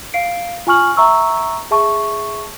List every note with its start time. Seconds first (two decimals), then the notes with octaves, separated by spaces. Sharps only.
0.14 F5 C7 D7
0.67 F4 G#5 C#6 F6 F#7
0.97 E5 A#5 C#6 E6
1.71 G#4 E5 A5 C#6